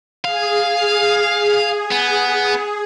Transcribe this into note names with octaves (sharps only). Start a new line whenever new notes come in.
G#4 F5
B3